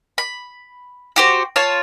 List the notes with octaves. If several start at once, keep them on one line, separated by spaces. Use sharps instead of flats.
B5
F#4 G4 C5
F4 C#5 A5